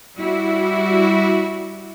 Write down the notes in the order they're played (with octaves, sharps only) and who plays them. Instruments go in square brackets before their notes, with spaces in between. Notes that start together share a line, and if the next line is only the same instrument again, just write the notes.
[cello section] G3 E4 F#4